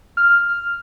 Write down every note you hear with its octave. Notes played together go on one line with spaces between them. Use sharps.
F6